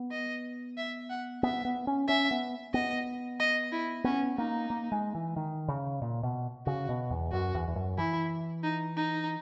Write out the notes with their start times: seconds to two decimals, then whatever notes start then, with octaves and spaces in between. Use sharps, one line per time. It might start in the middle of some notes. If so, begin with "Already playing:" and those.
Already playing: B3
0.11 D#5
0.78 E5
1.10 F#5
1.43 B3 E5
1.65 B3
1.87 C#4
2.08 C#4 E5
2.31 B3
2.74 B3 D#5
3.40 D#5
3.72 E4
4.04 B3 C#4
4.38 A#3 D#4
4.70 A#3
4.92 G#3
5.15 E3
5.36 D#3
5.68 C#3
6.02 A#2
6.23 B2
6.67 C#3 F#4
6.89 B2
7.11 E2
7.32 F#2 F#4
7.54 E2
7.68 E2
7.76 F#2
7.98 E3 E4
8.64 D#4
8.97 D#4